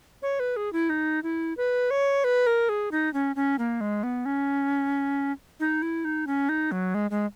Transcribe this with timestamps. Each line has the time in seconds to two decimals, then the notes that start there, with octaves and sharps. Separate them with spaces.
0.22 C#5
0.40 B4
0.56 G#4
0.73 E4
0.90 D#4
1.23 E4
1.57 B4
1.91 C#5
2.24 B4
2.47 A#4
2.69 G#4
2.91 D#4
3.14 C#4
3.36 C#4
3.59 A#3
3.81 G#3
4.03 B3
4.25 C#4
5.60 D#4
5.82 E4
6.05 D#4
6.27 C#4
6.49 D#4
6.72 F#3
6.94 G#3
7.11 G#3